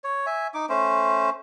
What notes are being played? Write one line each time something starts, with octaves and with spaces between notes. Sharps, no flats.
C#5
E5 G#5
D#4 D6
A3 C#4 C5